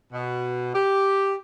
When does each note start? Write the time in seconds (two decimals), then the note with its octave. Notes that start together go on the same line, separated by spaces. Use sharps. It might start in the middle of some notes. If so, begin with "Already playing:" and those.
0.12 B2
0.75 G4